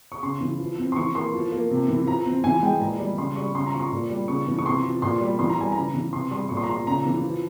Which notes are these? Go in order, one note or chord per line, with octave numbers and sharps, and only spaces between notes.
C#6
C#3 C6
E3
F3
C4
C6
E3 C#6
A#3 C6
F3
A#3
C3
E3
F3 A#5
C4
E3 G#5
G#3 G5
A#2 A#5
G3
C#3 C6
G3 C#6
C#3 C6
A#5
F3 C#6
C6
A#2
G3
C#3 C#6
E3
C#6
C3 C6
F3
A#2 C6
G3
E3 C6
A#5
G3 G#5
C#3 A#5
E3
C3 C6
G3 C6
A#2 C#6
C6
A#5
F3 C6
C#3 A#5
E3
F3